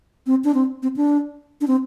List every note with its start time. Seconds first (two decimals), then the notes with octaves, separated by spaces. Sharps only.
0.27 C4
0.44 D4
0.54 C4
0.83 C4
0.96 D4
1.61 D4
1.68 C4